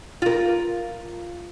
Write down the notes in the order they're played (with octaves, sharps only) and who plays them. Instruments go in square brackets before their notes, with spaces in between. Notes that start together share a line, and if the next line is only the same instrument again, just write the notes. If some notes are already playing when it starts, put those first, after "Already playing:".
[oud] F4 A#4